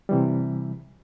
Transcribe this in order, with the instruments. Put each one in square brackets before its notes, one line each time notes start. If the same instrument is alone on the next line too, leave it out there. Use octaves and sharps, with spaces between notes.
[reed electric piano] C3 E3 G3